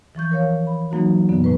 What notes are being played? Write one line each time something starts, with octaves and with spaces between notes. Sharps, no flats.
E3 F3 C#6 G6
A#4 C#5 F5
B5
E3 F#3 A#3 D#4 F#4
F#2 B2 D3 B3
A2 D3 B4